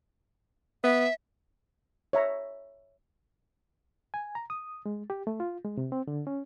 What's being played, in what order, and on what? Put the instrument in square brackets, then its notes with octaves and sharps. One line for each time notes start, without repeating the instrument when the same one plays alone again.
[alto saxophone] B3 [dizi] E5
[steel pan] C#5 E5 A#5
[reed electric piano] G#5
A#5
D#6
G#3
G4
A3
F4
G#3
C3
C4
D3
C#4